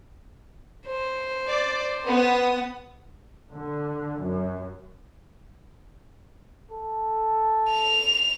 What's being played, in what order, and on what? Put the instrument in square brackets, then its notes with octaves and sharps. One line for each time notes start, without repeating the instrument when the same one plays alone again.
[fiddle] C5
[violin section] D5
B3 D#6
[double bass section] D3
F#2
[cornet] A4
[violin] F7